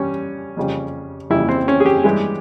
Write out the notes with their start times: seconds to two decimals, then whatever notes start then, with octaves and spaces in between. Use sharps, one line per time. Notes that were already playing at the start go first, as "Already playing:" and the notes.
Already playing: G2 G3 C#4
0.57 F2 C#3 G3
1.30 F2 C#3 G3 E4
1.49 C4
1.68 C#4
1.80 G#4
1.86 G4
2.04 G2 E3 G#3